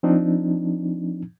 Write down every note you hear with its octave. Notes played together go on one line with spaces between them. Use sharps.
F3 C4 D4 D#4